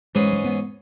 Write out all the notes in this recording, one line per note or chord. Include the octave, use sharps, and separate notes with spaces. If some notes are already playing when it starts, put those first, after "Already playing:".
G#2 E3 G#3 C#4 G#4
G#3
B3